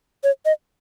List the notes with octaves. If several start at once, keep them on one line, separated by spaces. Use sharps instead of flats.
C#5
D#5